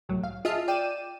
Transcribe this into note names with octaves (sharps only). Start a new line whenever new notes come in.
C2 A2 F#3
F5
F4 G#4 D#5 E5 A5 F6
D5 G5 D#7 E7